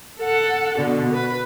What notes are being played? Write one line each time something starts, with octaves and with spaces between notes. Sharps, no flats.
A4 F#5
B2 D3
B4